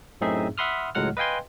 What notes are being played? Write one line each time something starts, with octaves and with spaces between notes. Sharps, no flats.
F#2 A2 C4 D#4 G#4 E5
E5 F#5 B5 C6 D#6 F6
C#2 A2 F#3 G#3 F#5 F6
B4 D#5 F5 G5 G#5 C6